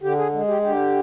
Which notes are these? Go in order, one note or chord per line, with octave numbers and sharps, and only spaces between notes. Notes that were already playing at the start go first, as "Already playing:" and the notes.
D3 G4
G#4
G#3
G4
D3 G4